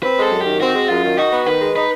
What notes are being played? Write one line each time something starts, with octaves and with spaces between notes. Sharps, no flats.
C4 B4
G#3 A4
F#2
D#3 G4
C4 F#4
G#3
F#2 F4
D#3
D#4 F#4
B3
D#3 B4
G#3
D#4 B4